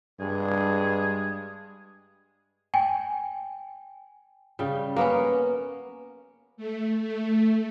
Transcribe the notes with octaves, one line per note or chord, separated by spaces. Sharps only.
G2 G#3 G#4
G5 G#5
C#3 G3
A#3 B3 C#4
A3
A3